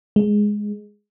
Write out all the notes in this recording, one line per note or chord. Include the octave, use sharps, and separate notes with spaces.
G#3